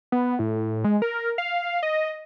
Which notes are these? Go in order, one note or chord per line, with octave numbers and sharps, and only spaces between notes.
B3
A2
G#3
A#4
F5
D#5